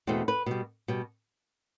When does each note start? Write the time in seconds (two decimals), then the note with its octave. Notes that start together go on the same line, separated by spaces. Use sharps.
0.07 E2 B2 A3 C4
0.28 B4
0.46 B2 G3
0.88 B2 G3